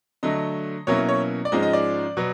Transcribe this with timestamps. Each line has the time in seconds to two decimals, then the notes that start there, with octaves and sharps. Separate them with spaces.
0.23 D3 F#3 A3 D#5
0.87 B2 F#3 A#3 C#4 E4 C#5
1.09 C#5
1.45 D5
1.52 G#2 F3 G#3 C#4 D#5
1.62 D#5
1.73 D5
2.17 B2 F#3 B3